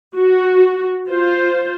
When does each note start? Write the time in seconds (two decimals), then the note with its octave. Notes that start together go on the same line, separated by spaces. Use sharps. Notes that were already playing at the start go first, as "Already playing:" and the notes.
0.16 F#4
1.09 F4 C5